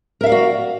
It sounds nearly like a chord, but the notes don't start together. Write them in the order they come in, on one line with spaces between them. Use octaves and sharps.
A#4 E5 F5 D5 F#4